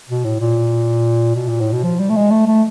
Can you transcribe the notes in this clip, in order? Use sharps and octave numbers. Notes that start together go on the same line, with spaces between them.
B2
A2
A#2
B2
A#2
A2
B2
F3
G3
A3
G#3
A3
A3